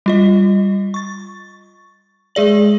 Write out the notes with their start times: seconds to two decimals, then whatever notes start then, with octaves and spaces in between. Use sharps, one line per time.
0.06 G3 F4 D#5
0.94 C#6 A6
2.35 G#3 G#4 D5 F#7